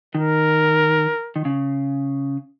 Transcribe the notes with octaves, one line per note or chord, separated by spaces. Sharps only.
D#3 A#4
D#3
C#3